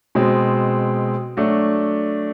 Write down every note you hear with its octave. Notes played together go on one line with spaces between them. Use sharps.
B2 G#3 C4
F#3 A3 D4 F#4